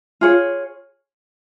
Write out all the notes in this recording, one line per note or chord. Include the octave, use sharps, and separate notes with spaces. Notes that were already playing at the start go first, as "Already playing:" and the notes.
F4 G#4 C#5